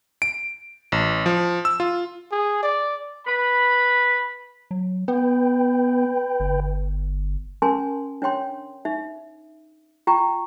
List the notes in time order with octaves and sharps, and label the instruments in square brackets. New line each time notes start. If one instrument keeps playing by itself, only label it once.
[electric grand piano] D7
A1
F3
E6
F4
[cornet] G#4
D5
[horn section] B4 B5
[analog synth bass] F#3
[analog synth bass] B3 [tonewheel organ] B4 G5
[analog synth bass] G1
[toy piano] C#4 A#4 G#5 A5 C6
D4 C#5 G5 C6
D#4 E5
F4 G5 A#5 C#6